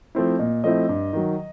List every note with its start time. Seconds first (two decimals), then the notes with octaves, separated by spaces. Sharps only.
0.15 F3 A3 C4 E4
0.39 A#2 D#5
0.64 F3 A3 C4 E4 D#5
0.89 G2
1.13 D#3 F#3